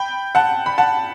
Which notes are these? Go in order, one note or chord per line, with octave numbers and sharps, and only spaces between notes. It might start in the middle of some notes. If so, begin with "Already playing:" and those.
Already playing: G5 B5
F#5 A5
B5
F#5 A5